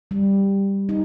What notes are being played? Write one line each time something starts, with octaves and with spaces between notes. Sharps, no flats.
G3
D#4